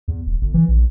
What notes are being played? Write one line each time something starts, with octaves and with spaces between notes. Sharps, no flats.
E2
D#1
G1
E3
A#1